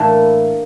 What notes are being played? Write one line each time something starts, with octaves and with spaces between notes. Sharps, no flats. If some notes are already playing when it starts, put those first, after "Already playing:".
Already playing: A2 E3 A3 A#3 D4 E4 G4